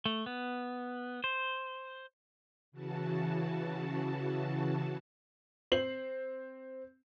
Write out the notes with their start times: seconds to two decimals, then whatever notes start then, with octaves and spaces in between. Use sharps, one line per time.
0.06 A3
0.26 B3
1.24 C5
2.72 C#3 E3 F#4 A5
5.72 C4 C7 F#7